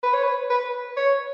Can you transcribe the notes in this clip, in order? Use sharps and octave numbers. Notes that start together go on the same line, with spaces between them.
B4
C#5
B4
B4
C#5